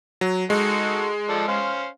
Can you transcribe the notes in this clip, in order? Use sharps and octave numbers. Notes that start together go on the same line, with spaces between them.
F#3
G#3 D#4 F#4 A4
F3 A4 D5
C#4 C5 F5